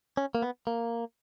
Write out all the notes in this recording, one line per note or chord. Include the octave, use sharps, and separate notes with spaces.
C#4
A#3
B3
A#3